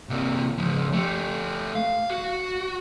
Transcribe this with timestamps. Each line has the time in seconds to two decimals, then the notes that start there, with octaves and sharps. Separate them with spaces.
0.09 C3 A#3
0.58 C#3 F3
0.93 A3 G4
1.75 F5
2.10 F#4